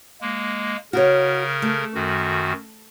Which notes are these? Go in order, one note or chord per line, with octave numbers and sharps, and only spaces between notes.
G#3 A#3
C#3 F#4 A#4 C#5
A3
F#2 D#3 F#4